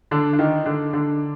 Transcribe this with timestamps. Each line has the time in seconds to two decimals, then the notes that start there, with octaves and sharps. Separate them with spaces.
0.11 D3 D4
0.33 D4
0.39 D#3 D#4
0.66 D3 D4
0.93 D3 D4